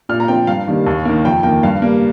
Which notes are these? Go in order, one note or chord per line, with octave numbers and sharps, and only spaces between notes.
A#2 F6
A#5
F3 C4 G5
G2 F5
D#3 G3 A#3
D#2
D#3 A#3
F2 G5
D#3 A#3 G5
G2 F5
G3 A#3